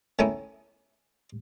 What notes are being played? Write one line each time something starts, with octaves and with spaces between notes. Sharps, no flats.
D#3 A3 C#4 D#4 E4